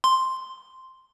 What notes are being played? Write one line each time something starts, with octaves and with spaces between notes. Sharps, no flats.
C6